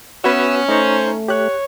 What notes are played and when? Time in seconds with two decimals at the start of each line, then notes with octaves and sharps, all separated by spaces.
0.24 B3 C#4 F#4 B4 E5 E6
0.69 A3 D#4 C5 A#5 C#6
1.28 G4 C#5 F#6